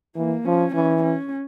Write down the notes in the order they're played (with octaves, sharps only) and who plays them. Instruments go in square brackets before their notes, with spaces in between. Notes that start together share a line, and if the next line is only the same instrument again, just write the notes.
[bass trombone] E3 [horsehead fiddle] A#3
[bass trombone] F3 [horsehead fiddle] C#4
[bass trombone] E3 [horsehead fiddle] C#4
[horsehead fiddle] C#4